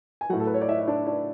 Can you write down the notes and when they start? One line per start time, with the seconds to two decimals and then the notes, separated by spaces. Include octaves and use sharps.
0.21 G#5
0.29 F#3 F#4 F#5
0.33 A2
0.40 A4
0.47 B4
0.54 C#5
0.61 D5
0.68 E4 E5
0.80 E5
0.88 D4 D5
1.07 D4 D5